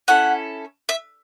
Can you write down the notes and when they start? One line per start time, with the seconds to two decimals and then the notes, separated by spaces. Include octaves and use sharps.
0.08 C#4 E4 A4 F#5
0.89 E5